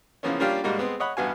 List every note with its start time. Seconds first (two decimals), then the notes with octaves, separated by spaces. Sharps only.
0.23 C#3 E3 F3 A#3 B3 C#4
0.40 G3 A#3 C#4 D4 F4 G4
0.64 G#2 G3 G#3 A#3 F#4
0.78 G#3 B3 C4
1.00 C#5 D#5 F#5 B5
1.17 A1 G2 B3 F#4 F5 G#5